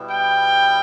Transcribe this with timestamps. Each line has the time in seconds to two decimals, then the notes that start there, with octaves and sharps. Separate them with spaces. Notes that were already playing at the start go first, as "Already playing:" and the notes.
Already playing: B2 G3 B3 E4
0.09 G5